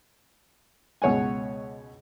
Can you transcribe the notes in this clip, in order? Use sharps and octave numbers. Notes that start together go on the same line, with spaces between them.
C#2 B2 C#5 F#5 G#5